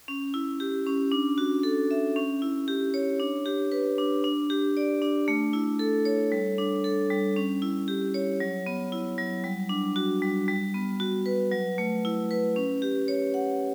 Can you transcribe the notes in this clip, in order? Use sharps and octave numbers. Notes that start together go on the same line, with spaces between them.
C#4
E4
G4
C#4
D4
F#4
A4
E5
C#4
E4
G4
C#5
D4
G4
B4
D4
D4
G4
D5
D4
A3
E4
A4
C#5
G3
D4
A4
G3
C#4
E4
G4
C#5
F#3
B3
E4
F#3
G3
D4
F#4
G3
G3
B3
F#4
B4
F#3
A3
E4
B4
C#4
G4
C#5
F#5